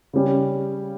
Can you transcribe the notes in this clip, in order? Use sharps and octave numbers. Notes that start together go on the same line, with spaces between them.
C#3 G3 C#4 G4